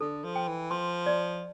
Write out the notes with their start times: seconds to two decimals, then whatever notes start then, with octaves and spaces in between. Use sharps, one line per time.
0.01 D3 A4
0.24 F3
0.36 G5
0.48 E3
0.71 F3 C6
1.06 D5